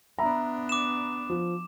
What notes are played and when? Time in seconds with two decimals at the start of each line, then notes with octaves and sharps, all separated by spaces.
0.18 B3 D4 E5 A#5 B5
0.69 D6 E7
1.30 F3